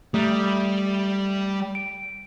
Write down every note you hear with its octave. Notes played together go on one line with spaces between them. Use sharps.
G3 A3
D7